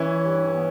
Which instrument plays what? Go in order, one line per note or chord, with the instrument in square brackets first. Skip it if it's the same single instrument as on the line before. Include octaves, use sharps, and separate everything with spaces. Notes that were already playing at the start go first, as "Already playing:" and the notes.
Already playing: [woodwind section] E3 [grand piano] C#4 E4
[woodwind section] G2
B3